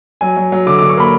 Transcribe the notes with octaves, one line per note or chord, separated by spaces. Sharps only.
F#3 G#5
F#3
F#3
D3 D6
D6
D3
C#6
A#3 B5